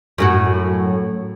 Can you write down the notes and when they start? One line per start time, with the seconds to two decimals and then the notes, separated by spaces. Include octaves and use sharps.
0.18 F#2 A2 F#4